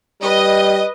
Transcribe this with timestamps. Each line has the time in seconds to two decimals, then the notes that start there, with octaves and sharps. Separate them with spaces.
0.22 G3 B4 D#5